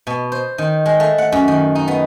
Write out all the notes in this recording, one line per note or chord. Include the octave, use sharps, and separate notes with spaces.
B2
C5
D#3
G#3
A3
F#5
F#2
D#3
D#4
B3